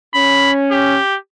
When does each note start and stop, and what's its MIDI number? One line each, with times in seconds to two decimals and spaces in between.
0.14 0.98 61
0.14 0.52 83
0.72 1.17 67